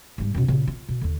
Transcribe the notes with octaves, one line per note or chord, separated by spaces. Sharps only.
G#2 G3
F#2 B2
A#2 C#3
F4
B2
D#2 D3